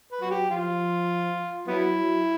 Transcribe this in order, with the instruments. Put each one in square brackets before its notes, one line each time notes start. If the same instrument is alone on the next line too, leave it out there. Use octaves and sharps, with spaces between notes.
[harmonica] B4
[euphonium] F#3 [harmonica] F#4
[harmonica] G4
[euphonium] F3 [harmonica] F4
[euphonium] F#3 [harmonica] B3 E4
[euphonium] F#3